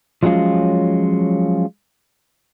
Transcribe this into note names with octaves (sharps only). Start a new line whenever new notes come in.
F3 F#3 G#3 C#4 F4